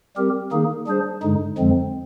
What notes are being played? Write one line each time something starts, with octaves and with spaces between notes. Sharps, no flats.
G3 C4 G4 A#4
D#3 A#3 D#4 G#4
G3 D4 G#4 C5
G2 D3 G#3 D#4
F2 D3 F3 G#3 C4